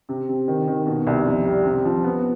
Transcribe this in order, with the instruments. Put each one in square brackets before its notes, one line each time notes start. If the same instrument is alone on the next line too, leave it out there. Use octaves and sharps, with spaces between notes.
[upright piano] C3
C3
D#3
D#3
B2
C2
F2
G3
C3
F3
B3